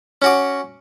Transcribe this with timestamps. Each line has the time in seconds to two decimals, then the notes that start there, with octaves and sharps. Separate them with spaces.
0.22 C#4 F#4 D6